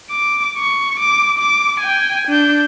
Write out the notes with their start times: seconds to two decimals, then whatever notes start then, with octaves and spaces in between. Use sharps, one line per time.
0.11 D6
0.58 C#6
1.00 D6
1.38 D6
1.80 G5 G#5
2.28 D4 G6